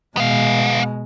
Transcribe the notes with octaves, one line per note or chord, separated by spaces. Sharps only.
B2 G#3 B3 F5